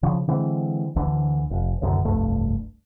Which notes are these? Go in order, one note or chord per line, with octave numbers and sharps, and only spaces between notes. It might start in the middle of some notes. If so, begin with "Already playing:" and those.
C#3 F3
D3 E3 G#3 C4
D2 D3 E3
F1
D#1 C2 F#2 D3
F1 C2 G2 A3